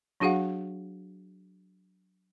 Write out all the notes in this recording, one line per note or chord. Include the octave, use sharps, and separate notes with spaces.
F#3 D4 F#4 G#4 F5 F#5